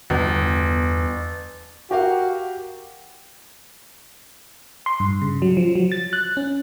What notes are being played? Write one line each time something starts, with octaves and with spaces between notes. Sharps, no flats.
G1 E2
F#4 G4 A#4 F5
C6
G2
C#3
F#3
F3
F#3
A6
F#6
C#4